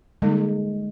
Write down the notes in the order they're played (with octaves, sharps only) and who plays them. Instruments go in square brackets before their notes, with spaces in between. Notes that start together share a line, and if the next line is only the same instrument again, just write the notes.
[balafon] D3 G3 A#3 D#4 [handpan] G#3